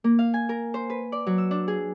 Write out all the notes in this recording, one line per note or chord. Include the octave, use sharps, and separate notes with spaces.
A#3
F5
G#5
A#4
C5
B4
D5
F#3
E6
D4
G#4